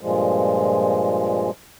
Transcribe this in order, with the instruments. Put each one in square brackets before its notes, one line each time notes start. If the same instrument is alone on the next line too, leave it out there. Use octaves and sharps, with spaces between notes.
[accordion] G2 A#2 F3 G#3